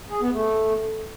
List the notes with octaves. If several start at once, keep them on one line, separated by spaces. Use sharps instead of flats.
G#4
B3
A3